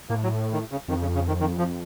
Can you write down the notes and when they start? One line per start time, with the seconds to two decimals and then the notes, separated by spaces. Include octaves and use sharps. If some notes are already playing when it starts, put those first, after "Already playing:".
0.09 A2 A#3
0.23 F#3
0.53 D#3
0.72 C#3
0.88 F2 D#3
1.01 C#3
1.15 C#3
1.28 D#3
1.40 D#3
1.58 F3